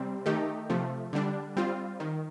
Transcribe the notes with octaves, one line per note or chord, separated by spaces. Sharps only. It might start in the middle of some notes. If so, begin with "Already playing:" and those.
Already playing: C3 G3 C4
D#3 A3 D#4 G4
C3 F3 A3
D3 G3 D4
G3 C4 F4
D#3